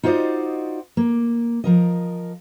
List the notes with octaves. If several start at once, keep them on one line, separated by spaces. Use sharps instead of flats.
D#4 F4 F#4 C5 D5 D#5
A#3
F3 A#4 D#5